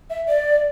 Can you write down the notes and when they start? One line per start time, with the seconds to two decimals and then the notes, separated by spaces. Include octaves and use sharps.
0.10 E5
0.28 D5